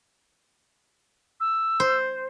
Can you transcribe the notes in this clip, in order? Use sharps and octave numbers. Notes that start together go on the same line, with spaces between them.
E6
C5